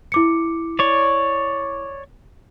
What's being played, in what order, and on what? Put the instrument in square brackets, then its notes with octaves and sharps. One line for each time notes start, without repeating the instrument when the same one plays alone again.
[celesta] E4 D6 C#7
[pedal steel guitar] C#5 D5